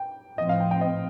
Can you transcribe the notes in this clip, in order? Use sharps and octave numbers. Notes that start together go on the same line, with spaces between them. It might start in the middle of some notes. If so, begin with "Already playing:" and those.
Already playing: G5
A2 F3 C4 D#5
F5
G5
G5
D#5